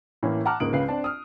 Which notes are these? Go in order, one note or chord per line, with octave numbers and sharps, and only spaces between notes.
A2 E3 A#3 C#4
F#5 A5 A#5 D6 F6 F#6
C#2 G#2 A#3 D#6 D7 F#7
C#2 C#3 B4 F5 C7
C4 D4 A5
D#6 F6